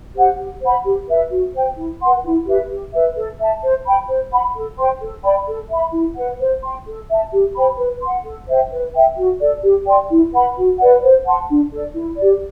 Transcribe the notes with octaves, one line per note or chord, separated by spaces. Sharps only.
G4 C5 F#5
G4
C5 F#5 B5
G4
B4 E5
F#4
C5 G5
E4
B4 F#5 C6
E4
G4 B4 E5
G4
B4 E5
A4
E5 A5
C5
G5 B5
C5
F#5 B5
A4
C5 G5 C6
A4
D5 G5 B5
A4
E5 B5
E4
B4 F#5
C5
G5 C6
A4
E5 A5
G4
C5 G5 B5
B4
F#5 C6
A4
C5 E5 G5
B4
E5 G5
F#4
A4 D5
G4
D5 G5 C6
E4
B4 F#5 B5
F#4
B4 D5 F#5
C5
F#5 A5 C6
D4
A4 D5
E4
G4 D5